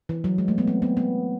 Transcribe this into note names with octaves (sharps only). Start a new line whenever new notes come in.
E3
F#3
G#3
A3
B3
C4
B3
B3